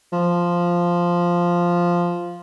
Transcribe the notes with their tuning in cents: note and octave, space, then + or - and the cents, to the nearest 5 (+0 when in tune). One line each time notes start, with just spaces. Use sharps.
F3 -5